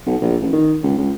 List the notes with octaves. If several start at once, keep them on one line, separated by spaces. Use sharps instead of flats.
B1
A#1
A1
D#3
C#2
C#2